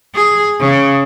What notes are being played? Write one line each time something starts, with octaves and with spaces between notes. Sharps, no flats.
G#4
C#3